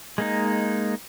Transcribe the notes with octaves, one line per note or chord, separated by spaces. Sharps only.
G#3 A#3 D#4